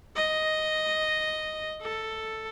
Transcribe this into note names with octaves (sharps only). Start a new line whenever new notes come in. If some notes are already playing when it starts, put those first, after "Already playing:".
D#5
A4